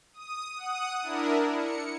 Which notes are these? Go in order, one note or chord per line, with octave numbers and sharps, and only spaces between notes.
D#6
F#5 D#6
D4 E4 A#4
C#7